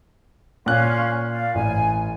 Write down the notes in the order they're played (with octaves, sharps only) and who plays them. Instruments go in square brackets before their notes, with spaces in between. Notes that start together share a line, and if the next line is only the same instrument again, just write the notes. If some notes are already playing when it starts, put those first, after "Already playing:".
[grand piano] A#2 F#6 [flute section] C#4 F5 C6
[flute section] D5 F5
[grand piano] A1 [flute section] G#5